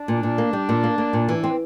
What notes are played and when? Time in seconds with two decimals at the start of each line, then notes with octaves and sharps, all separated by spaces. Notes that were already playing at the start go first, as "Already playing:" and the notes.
Already playing: D4
0.08 A#2
0.23 A#2
0.38 A#3
0.53 G3
0.69 A#2
0.84 A#3
0.98 A#3
1.13 A#2
1.29 E3
1.44 C4